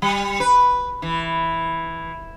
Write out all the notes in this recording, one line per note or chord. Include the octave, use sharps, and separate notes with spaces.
G3
B4
E3